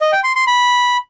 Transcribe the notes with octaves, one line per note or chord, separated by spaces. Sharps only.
D#5
G5
C6
C6
B5